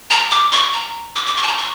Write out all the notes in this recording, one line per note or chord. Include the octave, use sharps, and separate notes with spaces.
A#5
D6
C#6
A#5
D6
D6
C#6
A5
A#5
C#6